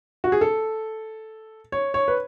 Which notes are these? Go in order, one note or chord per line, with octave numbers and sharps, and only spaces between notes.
F#4
G#4
A4
C#5
C#5
B4